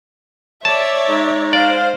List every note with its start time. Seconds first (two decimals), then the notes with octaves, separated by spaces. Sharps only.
0.65 C#5 D5 E5 A5
1.09 G#3 D#4
1.53 C5 D5 F5